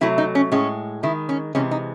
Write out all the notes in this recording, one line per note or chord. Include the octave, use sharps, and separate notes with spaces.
C3 F#3 A3 E4
D#4
C#4
A2 G#3 C#4
D#3 G#3 E4
C#4
C3 E3 G#3 C#4
D#4